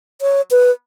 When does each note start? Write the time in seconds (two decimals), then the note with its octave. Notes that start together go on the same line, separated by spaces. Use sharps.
0.21 C#5
0.51 B4